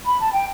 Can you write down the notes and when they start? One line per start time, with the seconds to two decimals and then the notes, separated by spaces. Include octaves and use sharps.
0.06 B5
0.19 A5
0.32 G5